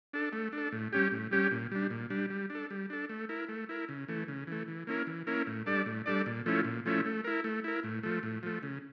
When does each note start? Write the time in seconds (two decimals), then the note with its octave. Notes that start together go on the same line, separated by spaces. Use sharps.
0.13 D4 A4
0.33 A3
0.53 D4
0.58 A4
0.72 A2
0.93 G3 C#4 G4
1.12 A2
1.31 G3 C#4 G4
1.51 A#2
1.72 G3 D4
1.91 A#2
2.10 G3 D4
2.30 G3
2.50 D4
2.55 A4
2.70 G3
2.90 D4 A4
3.09 A3
3.29 E4 A#4
3.49 A3
3.69 E4 A#4
3.89 C#3
4.08 E3 A3
4.28 C#3
4.47 E3 A3
4.68 E3
4.87 A#3 C#4 E4 A#4
5.07 E3
5.27 A#3 C#4 E4 A#4
5.47 A2
5.66 G3 D4 A4 D5
5.86 A2
6.06 G3 D4 A4 D5
6.26 A#2
6.46 F3 A3 C#4 E4
6.65 A#2
6.85 F3 A3 C#4 E4
7.05 A3
7.24 E4 A#4
7.44 A3
7.64 E4 A#4
7.84 A2
8.03 F3 A3
8.23 A2
8.43 F3 A3
8.63 C#3